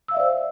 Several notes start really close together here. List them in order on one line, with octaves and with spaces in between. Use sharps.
E6 F5 E5 D5 C5